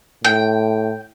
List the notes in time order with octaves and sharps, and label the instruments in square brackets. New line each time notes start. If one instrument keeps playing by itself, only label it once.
[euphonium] A2 [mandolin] G5